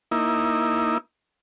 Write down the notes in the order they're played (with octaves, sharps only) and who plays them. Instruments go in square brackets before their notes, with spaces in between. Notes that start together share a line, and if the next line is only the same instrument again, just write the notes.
[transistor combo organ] A#3 D#4 E4